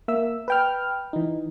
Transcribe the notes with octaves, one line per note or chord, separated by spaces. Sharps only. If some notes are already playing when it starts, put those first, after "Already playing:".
A#3 E5 E6
B4 G5 F6
E3 D#4